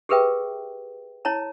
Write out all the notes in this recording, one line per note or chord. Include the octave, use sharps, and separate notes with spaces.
G4 G#4 A#4 B4 E5 G5
E4 C#5 A5 A#5